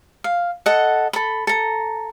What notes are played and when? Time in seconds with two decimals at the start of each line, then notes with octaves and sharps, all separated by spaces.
0.24 F5
0.66 A4 D#5 F#5
1.13 A4 B5
1.47 A4 A#5